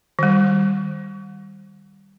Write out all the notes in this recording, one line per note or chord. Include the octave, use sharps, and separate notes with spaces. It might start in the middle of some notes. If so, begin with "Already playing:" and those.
D#3 G3